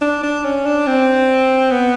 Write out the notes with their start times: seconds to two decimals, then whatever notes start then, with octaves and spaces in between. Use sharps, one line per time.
0.02 D4
0.23 D4
0.45 C#4
0.66 D4
0.87 C4
1.71 B3